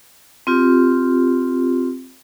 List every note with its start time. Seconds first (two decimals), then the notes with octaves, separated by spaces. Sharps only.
0.47 C4 F4 G4